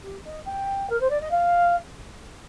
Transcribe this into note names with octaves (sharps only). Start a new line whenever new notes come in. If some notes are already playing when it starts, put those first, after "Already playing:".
G4
D#5
G5
A#4
C5
D5
D#5
F5